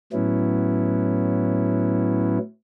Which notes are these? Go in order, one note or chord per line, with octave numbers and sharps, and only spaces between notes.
A2 F#3 B3 C#4 E4